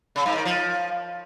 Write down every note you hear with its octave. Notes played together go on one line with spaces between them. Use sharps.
C#3
G#2
D#3
F3